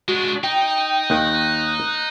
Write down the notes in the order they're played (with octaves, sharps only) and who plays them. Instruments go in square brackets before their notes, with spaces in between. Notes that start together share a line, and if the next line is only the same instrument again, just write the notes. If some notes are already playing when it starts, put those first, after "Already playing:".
[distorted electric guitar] G#3 D4 [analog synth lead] F#4
[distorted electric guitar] D#4 [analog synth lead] G5
[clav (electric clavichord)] D#2 D#3 G5 [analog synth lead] F#6